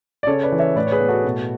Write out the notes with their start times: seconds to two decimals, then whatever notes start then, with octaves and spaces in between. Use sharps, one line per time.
0.23 D5
0.27 C#3 A4 C#5
0.43 B4 D5
0.52 E3
0.59 C#5 E5
0.76 A2 B4 D5
0.87 C#5
0.92 G#4 B4
1.00 B3
1.08 F#4 A4
1.25 B2